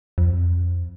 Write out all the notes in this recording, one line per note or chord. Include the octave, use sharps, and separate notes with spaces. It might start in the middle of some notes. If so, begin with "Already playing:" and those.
F2